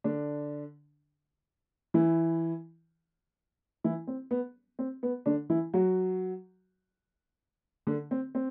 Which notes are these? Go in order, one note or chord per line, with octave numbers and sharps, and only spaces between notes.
D3 D4
E3 E4
E3 E4
C4
B3
C4
B3
D3 D4
E3 E4
F#3 F#4
D3 D4
C4
C4